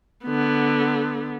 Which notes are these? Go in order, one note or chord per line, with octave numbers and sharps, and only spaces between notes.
D3 B3